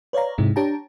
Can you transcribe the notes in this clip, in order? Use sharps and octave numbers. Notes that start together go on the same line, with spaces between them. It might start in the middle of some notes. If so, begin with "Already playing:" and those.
B4 C#5 D5 F5 A#5
G#2 C3 G#3 D#4 E4
D4 G4 C#5 G5 A5 A#5